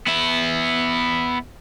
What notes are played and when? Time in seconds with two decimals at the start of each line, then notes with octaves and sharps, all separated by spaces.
0.07 B3 E4